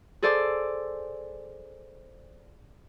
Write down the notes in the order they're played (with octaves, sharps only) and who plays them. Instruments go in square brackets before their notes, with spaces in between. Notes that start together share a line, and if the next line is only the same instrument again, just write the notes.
[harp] G#4 A4 C5 D5